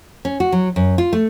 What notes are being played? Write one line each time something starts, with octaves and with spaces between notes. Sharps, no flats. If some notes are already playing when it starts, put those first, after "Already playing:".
C#4
F#4
F#3
F#2
F4
A3